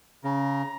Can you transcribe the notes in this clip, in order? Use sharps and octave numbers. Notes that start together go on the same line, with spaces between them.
C#3 A#5